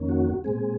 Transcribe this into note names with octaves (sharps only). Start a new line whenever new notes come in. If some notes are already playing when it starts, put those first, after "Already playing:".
Already playing: F2 D#3 A#3 C#4
F#4
A#2 G#3 C4 G#4